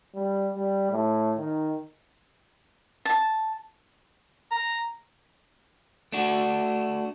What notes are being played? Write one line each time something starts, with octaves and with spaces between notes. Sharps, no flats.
G3
G3
A2
D#3
A5
A#5
A3 D4 F#4